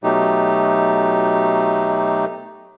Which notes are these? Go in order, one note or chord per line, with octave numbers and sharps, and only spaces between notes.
B2 F#3 A3 D#4 G4